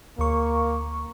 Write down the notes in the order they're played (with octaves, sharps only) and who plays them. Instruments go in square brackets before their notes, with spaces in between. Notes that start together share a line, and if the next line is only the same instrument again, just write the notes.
[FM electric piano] D2 C#6 [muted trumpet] A#3